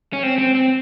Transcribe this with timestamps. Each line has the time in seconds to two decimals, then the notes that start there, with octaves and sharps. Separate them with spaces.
0.13 C#4
0.23 C4
0.38 C4
0.55 C4